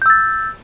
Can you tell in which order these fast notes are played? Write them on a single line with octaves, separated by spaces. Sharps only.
G6 E6 A6